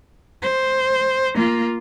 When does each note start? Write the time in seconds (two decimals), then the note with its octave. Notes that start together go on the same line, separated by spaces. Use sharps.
0.42 C5
1.35 A#3 F4